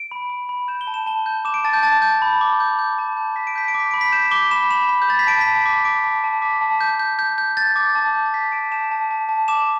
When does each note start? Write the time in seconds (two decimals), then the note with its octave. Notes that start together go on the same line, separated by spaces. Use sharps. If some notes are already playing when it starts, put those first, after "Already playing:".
Already playing: D7
0.11 B5
0.30 B5
0.49 B5
0.68 G6 E7
0.81 G7
0.87 A5
0.94 E7
1.06 A5 G7
1.26 G6
1.45 D6 E7
1.54 D7
1.64 A5 A6
1.73 G6
1.83 A5 A6
2.02 G6
2.22 B5
2.41 D6
2.60 G6
2.79 G6
2.99 A5
3.17 G6
3.36 A5 B6
3.47 D7
3.56 G6 B6
3.68 D7
3.74 D6
3.80 B6
3.91 B5 D7
4.01 B6
4.12 G6 E7
4.31 D6 G7
4.51 B5 E7
4.71 B5 E7
4.89 B5
5.02 G6
5.08 B5 A6
5.19 B6
5.27 A5 D7
5.41 B6
5.46 A5
5.66 D6 B6
5.85 D6 D7
6.04 A5
6.24 A5
6.42 D6 B6
6.61 A5
6.81 G6
6.99 G6
7.19 G6
7.38 G6
7.57 G6 A6
7.76 D6 A6
7.95 A5
8.14 G6
8.34 G6 B6
8.52 A5 D7
8.72 A5 E7
8.91 A5
9.11 A5
9.29 A5
9.48 D6 E7